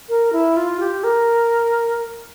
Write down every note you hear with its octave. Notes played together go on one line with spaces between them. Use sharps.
A#4
E4
F4
G4
A#4